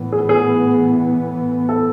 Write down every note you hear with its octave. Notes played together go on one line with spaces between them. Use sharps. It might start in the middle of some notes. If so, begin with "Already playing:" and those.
Already playing: A2 E3 B3
G#4
G#4
A4